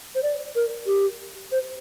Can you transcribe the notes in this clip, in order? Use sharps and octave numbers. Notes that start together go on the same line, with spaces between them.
C5
D5
A#4
G4
C5